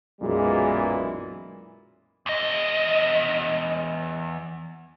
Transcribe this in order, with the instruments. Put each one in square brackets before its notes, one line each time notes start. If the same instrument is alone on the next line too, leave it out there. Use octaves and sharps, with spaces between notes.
[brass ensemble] B1 F#2 A#2 E3 G#3
[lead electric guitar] E2 D#5